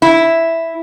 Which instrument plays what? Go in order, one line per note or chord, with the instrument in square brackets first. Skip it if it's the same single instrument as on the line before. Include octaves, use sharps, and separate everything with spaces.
[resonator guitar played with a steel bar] E4